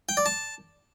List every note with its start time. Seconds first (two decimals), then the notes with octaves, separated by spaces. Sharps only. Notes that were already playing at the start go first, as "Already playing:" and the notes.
0.09 G5
0.17 D5
0.26 A5